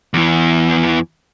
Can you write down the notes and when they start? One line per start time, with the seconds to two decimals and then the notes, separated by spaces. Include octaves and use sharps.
0.14 E2 E3